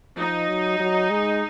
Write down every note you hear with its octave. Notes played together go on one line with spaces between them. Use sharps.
F3 D#4
F#3
F#3
G#3